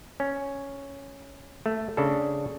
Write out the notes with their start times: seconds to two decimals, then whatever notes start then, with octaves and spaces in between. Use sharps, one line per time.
0.20 C#4
1.66 A3
1.97 C#3 D4 A4